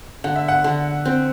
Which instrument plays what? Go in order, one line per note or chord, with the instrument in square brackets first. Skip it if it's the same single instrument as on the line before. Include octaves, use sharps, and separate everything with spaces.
[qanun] D3 [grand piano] F#5
[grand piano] E5
F#5
[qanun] D3
C4